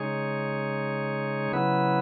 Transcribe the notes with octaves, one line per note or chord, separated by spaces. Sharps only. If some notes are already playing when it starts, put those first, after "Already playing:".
Already playing: C#3 G#3 D#4 G#4 C#5
C#3 F#3 B3 E4 B4